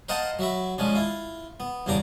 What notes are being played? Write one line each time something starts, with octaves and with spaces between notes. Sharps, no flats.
A#4 C5 D#5 F5 F#5 A5
F#3 F#4 E5 B5
F3 G#3 C#4 D4
E4 F4
B3
E2 G2 C#3 D4 A#5 D6